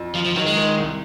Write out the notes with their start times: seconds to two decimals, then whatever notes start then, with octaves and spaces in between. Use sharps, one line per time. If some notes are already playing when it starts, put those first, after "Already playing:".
Already playing: F2
0.15 F3 F4
0.26 F3
0.36 D#3 F#3
0.46 G#3
0.57 D#3
0.78 C2